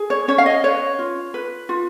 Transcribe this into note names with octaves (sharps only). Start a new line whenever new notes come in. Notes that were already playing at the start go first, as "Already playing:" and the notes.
Already playing: G#4
C#5
C#4 C#5
F5
D#5
B4 C#5
F4
B4
F4